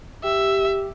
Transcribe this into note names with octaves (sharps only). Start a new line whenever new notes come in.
G4 E5